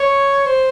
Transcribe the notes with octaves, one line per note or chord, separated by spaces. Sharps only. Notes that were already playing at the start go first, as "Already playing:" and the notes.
Already playing: C#5
C5